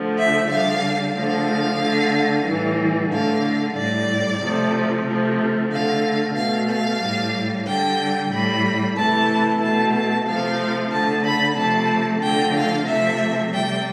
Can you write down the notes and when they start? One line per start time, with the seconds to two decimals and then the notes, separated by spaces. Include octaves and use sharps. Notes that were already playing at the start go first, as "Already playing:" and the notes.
Already playing: D3 F3 A3
0.18 E5
0.50 D3 G3 F5
1.15 D3 F3 A3 F5
1.81 D3 A3
2.45 A2 E3 G3
3.11 D3 A3 F5
3.76 A2 G3 D5
4.41 C3 F3 A3
5.06 C3 F3 A3
5.71 D3 A3 F5
6.35 B2 A3 F5
6.69 F5
7.01 A2 G3
7.66 D3 G3 G5
8.31 A2 G3 B5
8.96 C3 E3 A3 A5
9.61 B2 A3 A5
9.94 A5
10.26 C3 F3 A3 F5
10.91 D3 A3 A5
11.24 B5
11.56 C3 F3 A3 A5
12.21 D3 F3 A3 G5
12.54 F5
12.87 C3 F3 A3 E5
13.52 C3 G3 G5